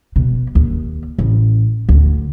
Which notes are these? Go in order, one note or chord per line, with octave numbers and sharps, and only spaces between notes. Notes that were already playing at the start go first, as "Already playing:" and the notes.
B2
D#2
A1
D2